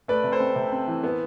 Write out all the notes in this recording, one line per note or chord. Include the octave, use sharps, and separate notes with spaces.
A3 B4 D5
C3
A4 C5
C4
C3
C4
E3
B3